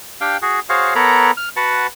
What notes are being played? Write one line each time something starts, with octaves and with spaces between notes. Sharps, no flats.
D4 G4 F5 G5
F#4 G#4
F#4 G#4 C5 C#5 F5
B3 A4 A#4 C#5 A#5 B5
F6
F#4 B4 F#5 A5